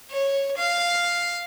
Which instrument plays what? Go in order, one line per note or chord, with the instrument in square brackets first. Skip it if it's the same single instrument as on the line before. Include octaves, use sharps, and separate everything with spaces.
[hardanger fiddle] C#5
F5